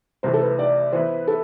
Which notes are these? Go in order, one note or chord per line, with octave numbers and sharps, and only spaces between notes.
C2 C3 E3 A3 C5
A4
B4
D5
E3 B3 E4 B4 C5
A4